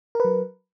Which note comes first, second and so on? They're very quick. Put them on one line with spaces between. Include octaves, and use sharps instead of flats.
A#4 B4 F#3